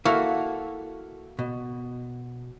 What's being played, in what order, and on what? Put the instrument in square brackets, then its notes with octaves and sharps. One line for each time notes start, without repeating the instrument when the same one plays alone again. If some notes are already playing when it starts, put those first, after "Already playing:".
[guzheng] A#3 F#4 [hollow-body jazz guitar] E4 A4 F5
[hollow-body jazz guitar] B2